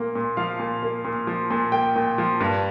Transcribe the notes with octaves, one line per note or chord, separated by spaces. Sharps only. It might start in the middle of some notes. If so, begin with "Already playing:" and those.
Already playing: A#2 A#3
A#2
F3 F5
A#2
A#3
A#2
F3
A#2
A#3 G5
A#2
F3
G2